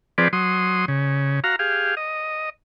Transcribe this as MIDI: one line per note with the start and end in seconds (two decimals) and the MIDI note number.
0.18 0.28 53
0.18 0.28 60
0.18 0.28 68
0.18 0.28 71
0.18 0.28 74
0.33 0.85 54
0.33 0.85 84
0.33 0.85 87
0.88 1.40 49
1.44 1.56 66
1.44 1.56 77
1.44 1.56 82
1.59 1.95 67
1.59 1.95 68
1.59 1.95 77
1.97 2.50 75